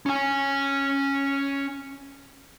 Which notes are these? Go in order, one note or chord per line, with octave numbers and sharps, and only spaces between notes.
C#4 G#5